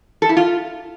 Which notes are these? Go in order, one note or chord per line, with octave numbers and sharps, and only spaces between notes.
A4
E4
F4